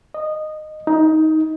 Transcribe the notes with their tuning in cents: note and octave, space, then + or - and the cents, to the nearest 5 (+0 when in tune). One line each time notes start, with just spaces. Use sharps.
D#5 -15
D#4 +15